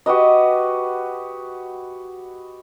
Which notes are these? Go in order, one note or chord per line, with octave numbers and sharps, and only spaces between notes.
F#4 G4 B4 D#5